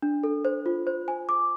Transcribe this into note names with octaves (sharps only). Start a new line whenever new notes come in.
D4
A4
C5
F4
C5
G#5
D6